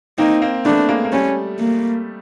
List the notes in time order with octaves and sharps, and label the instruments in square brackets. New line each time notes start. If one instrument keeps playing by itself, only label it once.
[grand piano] A#3 C4 [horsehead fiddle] D#4
[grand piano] A#3 C4
[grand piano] A3 B3 [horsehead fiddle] D4
[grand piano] G#3 A#3
A#3
[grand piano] G3 A3 [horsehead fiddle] C#4
[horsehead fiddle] A#3